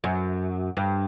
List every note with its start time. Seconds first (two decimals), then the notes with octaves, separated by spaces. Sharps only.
0.04 F#2
0.77 G2